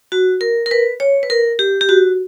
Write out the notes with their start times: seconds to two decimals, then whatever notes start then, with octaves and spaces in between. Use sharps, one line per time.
0.12 F#4
0.41 A#4
0.66 A#4
0.71 B4
1.00 C#5
1.23 B4
1.30 A#4
1.59 G4
1.81 G4
1.89 F#4